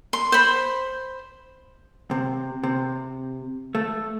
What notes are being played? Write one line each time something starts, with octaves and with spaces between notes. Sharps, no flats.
C6
C5 B5
C3
C3
A3